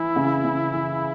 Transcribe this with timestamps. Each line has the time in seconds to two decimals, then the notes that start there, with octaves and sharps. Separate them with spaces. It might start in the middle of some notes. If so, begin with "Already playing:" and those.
Already playing: E3 E4
0.16 C#3
0.44 C#3
0.73 E3